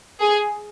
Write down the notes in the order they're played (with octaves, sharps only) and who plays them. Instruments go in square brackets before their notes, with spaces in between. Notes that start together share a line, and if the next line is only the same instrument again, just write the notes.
[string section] G#4